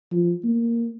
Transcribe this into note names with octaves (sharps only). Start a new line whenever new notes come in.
F3
A#3